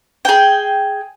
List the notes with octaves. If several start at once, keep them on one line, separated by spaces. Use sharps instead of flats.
G#4 G5